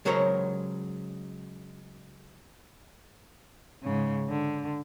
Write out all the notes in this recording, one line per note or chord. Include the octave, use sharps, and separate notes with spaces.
C#3 F#3 G#3 A#4 C5 C#5
G#2 C#3
D3